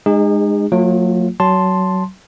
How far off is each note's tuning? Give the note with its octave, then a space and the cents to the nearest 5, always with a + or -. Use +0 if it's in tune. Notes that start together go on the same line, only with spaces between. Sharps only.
G#3 +0 D#4 -30 G#4 -40
F#3 -35 A3 +45 F4 +0
F#3 +20 A5 +0 C6 +0